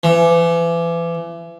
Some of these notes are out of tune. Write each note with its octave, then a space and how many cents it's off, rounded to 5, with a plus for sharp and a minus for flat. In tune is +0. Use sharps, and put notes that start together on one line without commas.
E3 +35